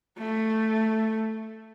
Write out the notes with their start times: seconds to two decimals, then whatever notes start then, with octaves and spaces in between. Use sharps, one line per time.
0.18 A3